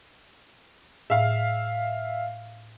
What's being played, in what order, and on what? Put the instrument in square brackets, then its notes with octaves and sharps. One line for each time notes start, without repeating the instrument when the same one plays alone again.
[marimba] A2 [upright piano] E5 F5